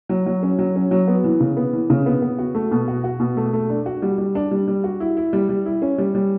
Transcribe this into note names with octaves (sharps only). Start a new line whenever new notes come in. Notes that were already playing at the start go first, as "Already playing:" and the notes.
F#3
F#3
C#4
F#3
C#4
F#3
B3
E3
C#3
B3
E3
C#3
B3
B3
F#4
A3
B2
F#4
F#4
B2
A3
A3
D4
F#4
G3
G3
D4
G3
G3
F#4
E4
E4
G3
G3
E4
C#4
G3
G3